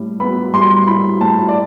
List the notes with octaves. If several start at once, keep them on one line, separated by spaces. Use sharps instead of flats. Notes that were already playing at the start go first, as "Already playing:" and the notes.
Already playing: A2 G3 E4
B3 B5
G3 C6
E4 B5
A2 A5
D5